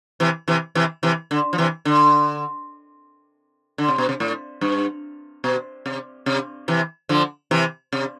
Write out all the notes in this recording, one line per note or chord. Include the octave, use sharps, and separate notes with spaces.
C3 E3
C3 E3
C3 E3
C3 E3
D3
F3
C3 E3
D3
D3
C3
B2
C3
A2
G2
B2
C3
C3
C3 E3
D3 F3
C3 E3
C3